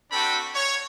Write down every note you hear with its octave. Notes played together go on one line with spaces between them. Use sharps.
C4 D4 F#4 A4 G5 B5
C#5